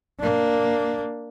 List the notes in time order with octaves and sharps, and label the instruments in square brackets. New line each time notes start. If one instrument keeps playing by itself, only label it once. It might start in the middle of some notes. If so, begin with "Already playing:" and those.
[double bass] A#3 D4